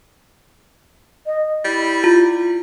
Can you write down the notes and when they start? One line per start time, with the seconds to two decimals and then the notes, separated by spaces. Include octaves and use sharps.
1.26 D#5
1.65 G3 E4
2.04 F4